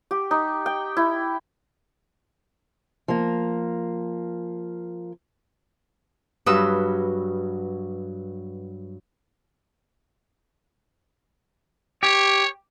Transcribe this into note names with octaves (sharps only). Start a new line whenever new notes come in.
G4
D#4
G5
E4
F3 A#3
G2 F#3 B4 D#6 E6
G4 C#5